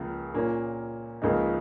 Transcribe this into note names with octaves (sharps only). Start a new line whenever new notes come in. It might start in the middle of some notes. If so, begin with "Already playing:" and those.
Already playing: C#2 C#3 F3 A#3
A#2 A#3 C#4
C#2 C#3 F3 A#3 D#4